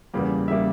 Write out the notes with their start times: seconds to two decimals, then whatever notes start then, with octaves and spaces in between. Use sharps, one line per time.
0.13 E2 C#3 G3 A#3
0.48 E5
0.50 C#3 G3 A#3